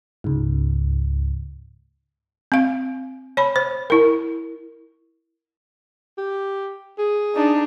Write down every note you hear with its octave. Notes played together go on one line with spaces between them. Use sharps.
C#2 G#2
C4 F5
C#5 B5
C5
E4 A#4
G4
G#4
D4 D#4